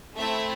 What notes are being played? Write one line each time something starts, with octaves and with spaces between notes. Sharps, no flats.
A3 C4 E4 E5